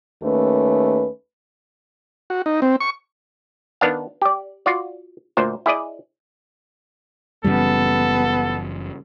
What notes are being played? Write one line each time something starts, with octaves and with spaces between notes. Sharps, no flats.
D#2 A3 C#4 B4
F#4
D#4
C4
C#6
D#3 B3 D4 F5
G4 D5
F4 F#4 D5
D2 A#2 C5
E4 G#4 D5 D#5
F#1 F#2 C#3 E3 G3 B3 A4